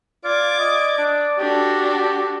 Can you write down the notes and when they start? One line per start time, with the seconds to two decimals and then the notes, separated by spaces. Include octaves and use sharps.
0.24 F4 D5 D6 G#6
0.60 D#5
0.98 D4
1.39 D4 F#4 G4 A4